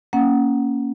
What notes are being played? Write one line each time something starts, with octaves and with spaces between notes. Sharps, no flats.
A#3 C#4 F#5